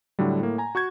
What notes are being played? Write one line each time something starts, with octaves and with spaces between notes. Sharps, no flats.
A2 D3 F#3 G3
A2 A#3
G#5 A#5
F#4 C#6 G6 G#6